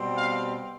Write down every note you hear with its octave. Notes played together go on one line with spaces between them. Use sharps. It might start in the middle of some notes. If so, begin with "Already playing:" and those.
Already playing: B2 G3 C4
F5